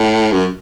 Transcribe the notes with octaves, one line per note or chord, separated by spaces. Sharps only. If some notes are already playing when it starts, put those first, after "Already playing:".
Already playing: A2
F#2